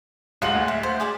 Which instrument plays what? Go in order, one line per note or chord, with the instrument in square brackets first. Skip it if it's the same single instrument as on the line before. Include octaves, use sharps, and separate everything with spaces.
[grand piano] D1 G#3 F#7 [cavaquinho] F4 F#4 F#5
[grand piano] D2
[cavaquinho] E5
C5
G#4 D5 E5